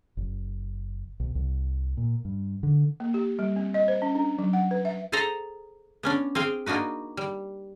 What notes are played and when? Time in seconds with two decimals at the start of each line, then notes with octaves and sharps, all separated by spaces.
0.17 F#1
1.20 B1
1.35 C2
1.97 A#2
2.25 G2
2.63 D3
3.00 A#3
3.14 G4
3.39 G3
3.56 C4
3.74 D#5
3.88 C5
4.02 C#4
4.15 D4
4.38 F#3
4.53 F#5
4.71 B4
4.85 E5
5.12 G#4 A4 C5 A5 A#5
6.03 B3 C#4 D4
6.35 C4 G#4 F5 G5
6.66 A#3 D4 D#4 F#4 B4
7.17 G3